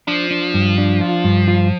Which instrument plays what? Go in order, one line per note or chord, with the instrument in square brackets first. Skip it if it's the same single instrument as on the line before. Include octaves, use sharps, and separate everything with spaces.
[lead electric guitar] F3 [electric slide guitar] D4
[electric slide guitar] D4
G2
D4
F4
G2
F4